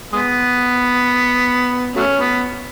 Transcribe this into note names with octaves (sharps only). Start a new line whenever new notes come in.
G#3 B3
F#3 A3 C#4
B3